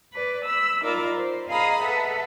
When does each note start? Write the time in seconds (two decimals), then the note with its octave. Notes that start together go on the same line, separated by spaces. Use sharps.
0.13 B4 D5
0.44 B5 E6
0.81 D#4 F4 A#4 D5 A#5 B5
1.16 C5
1.48 G#4 D#5 F5 A#5 B5 D#6
1.82 A4 B4 E5 F#5